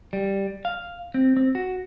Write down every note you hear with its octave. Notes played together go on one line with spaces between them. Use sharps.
G3
F5
C4
C4
F#4